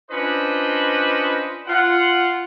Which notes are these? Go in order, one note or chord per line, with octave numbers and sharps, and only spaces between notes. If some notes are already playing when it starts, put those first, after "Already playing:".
C#4 D4 F4 B4 C5 D#5
F4 F#5